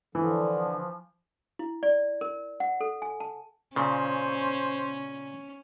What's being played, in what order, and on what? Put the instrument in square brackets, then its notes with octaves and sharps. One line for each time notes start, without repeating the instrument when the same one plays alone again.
[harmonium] D3 [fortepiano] E3 [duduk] F3
[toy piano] E4
D5
A#4
F#5
A4
G#5
A5
[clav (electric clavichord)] A#2 C#3 [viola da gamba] C#4 [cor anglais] C5